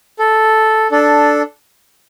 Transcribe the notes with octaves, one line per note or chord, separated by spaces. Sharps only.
A4
D4 A4